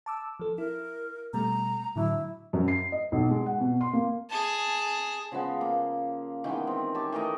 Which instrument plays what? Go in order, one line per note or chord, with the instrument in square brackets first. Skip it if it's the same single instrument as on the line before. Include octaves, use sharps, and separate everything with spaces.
[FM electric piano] A5 D6 E6
F3 A4
[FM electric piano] E4 [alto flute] A#4
[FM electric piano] B2 G3 A3 [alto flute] A#5
[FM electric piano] A2 D3 F#3 [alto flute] E4
[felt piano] F#2
C7
D#5
B1
G#3
F#5
B2
C6
A#3
[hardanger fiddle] G#4 A5
[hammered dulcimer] C#3 F3 G#3 B3
A#3
D#3 E3 G#3 B3
C4
G4 C#5 A5
E3 A3 A#4 D#5